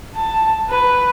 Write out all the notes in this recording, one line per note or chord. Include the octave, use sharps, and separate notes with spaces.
A5
B4